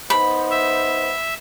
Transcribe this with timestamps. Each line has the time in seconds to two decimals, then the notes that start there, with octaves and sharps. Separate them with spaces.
0.10 B3 D#4 C5 B5
0.51 E5